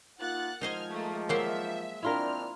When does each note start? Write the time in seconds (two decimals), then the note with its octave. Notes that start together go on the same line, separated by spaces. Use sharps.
0.20 A#3 D#4 F4 F#5 F#6 A6
0.61 D#3 F3 G#3 D#4 C5 D#5 F6 G#6
0.90 A3 A#3
1.29 F#3 A#3 C5 E5 F5
2.03 D#3 C4 D4 E4 F4 A#4 F6